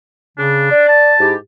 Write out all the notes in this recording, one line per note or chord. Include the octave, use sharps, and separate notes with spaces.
C#3 D4
D5
A5
G#2 E4 G4